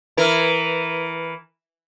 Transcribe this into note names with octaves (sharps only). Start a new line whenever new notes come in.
E3 A#4